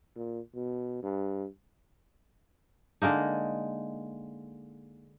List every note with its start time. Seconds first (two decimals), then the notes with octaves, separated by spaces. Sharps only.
0.16 A#2
0.55 B2
1.03 G2
3.02 D3 G#3 A#3 D#4